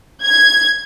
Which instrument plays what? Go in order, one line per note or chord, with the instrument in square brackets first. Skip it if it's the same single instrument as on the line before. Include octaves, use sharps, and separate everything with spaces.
[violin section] G#6